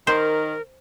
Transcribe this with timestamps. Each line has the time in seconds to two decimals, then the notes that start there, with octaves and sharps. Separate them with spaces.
0.07 D#3 A#4 C5